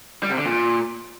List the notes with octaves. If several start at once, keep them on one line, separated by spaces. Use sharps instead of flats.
G3
C3
D3
A#2